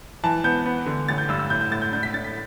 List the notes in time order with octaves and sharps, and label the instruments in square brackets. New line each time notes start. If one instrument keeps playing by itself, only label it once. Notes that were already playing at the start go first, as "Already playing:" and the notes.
[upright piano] E3 A5
B3 G6
B3
D3
A1 A6
G6
G2 E6
E6
A2 G6
G6
A2 A6
G6
D4 G6
B6
D4 A6
B6